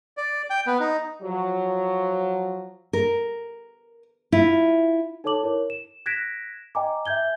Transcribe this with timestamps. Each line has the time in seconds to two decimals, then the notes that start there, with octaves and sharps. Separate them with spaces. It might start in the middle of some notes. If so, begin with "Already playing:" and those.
0.17 D5
0.50 G5
0.67 B3
0.80 D#4
1.22 F3 F#3
2.93 A#4
4.32 E4 F4
5.24 D#4 A4 C#5 A5 D6 F#7
5.43 E4 A#4 C#5
5.70 E7
6.06 F#6 G#6 A#6 B6 D7 E7
6.75 D#5 G5 G#5 A#5 D6
7.06 E5 G#5 G6 G#6 G7